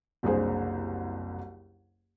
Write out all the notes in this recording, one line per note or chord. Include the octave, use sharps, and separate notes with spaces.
F#1 C2 D4 G#4 C5